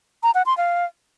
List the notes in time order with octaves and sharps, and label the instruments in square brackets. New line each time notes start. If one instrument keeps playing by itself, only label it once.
[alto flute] A#5
F#5
C6
F5